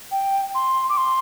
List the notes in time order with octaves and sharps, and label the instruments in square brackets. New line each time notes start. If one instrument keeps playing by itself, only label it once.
[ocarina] G5
C6
D6
C6